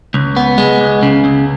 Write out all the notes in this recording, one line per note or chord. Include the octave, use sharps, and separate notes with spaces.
C#2
B3
G#3
C#2
C#3
C#2